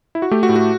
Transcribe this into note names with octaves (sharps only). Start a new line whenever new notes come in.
E4
F#4
A3 G4
F#4
A2
F#4